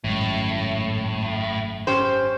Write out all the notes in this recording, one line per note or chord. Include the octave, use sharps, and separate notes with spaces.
G#1 F#2 A2 G#3
C#4 G4 C5